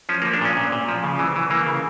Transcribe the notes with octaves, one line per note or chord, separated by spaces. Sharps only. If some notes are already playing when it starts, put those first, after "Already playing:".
F3 C#4
F3 A#3
D4
A#2 C#4
A#2
A#2
F3
C#3
E3
E3
E3 A#3
C#3